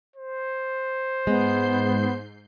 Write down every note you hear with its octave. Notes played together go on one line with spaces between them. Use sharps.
C5
G#2 G#3 B3 G6 C7